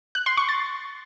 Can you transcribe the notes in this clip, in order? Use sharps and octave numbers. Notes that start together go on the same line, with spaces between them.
F#6
C6
C#6
A6